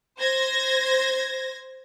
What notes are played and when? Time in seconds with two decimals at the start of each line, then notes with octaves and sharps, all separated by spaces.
0.19 C5 G#6 A#6